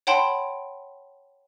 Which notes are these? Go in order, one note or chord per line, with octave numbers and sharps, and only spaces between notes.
C#5 F#5 G5 A5 B5 C6